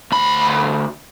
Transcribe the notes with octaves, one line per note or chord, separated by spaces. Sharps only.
D2 B5